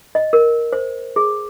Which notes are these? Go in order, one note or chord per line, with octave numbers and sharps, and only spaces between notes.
D#5
A#4
C5
G#4